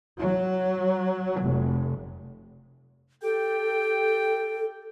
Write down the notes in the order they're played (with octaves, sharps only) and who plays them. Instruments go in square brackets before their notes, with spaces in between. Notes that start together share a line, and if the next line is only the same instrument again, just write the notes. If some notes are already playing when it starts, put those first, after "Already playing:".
[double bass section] F#3
F1
[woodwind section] G4 G5 [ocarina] A4